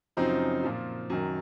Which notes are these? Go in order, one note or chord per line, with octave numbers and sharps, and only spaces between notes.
F#2 C#3 F3 C4 D#4
A#2 F3
F#2 D#3